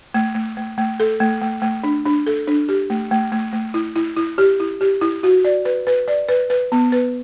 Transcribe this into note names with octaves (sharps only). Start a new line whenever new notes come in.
A3
A3
A3
A3
A4
A3
A3
A3
D4
D4
A4
D4
G4
A3
A3
A3
A3
E4
E4
E4
G4
E4
G4
E4
F#4
D5
B4
B4
D5
B4
B4
B3
B4